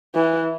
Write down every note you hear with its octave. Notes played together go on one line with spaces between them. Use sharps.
E3